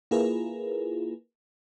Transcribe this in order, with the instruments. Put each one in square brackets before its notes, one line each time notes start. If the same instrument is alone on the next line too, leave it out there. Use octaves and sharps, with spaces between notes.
[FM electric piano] A#3 E4 F4 G#4 A#4 B4